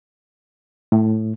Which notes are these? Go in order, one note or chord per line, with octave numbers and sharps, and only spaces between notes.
A2